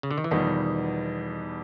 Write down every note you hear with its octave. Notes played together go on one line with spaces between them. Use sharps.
C#3
D3
D#3
E3
E2 B2 D#3 F3 G3 B3 D#4